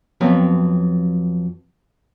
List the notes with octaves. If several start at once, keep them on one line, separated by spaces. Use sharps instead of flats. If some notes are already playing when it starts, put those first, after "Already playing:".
F2 F#3 B3 C4